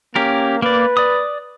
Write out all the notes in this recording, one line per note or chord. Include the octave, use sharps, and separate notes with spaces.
A#3 C#4 G4 A#4
A#3 B4 D5
D5 D#6